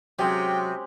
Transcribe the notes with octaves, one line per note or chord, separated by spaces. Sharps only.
C3 F#3 G#3 C#4 G4 G5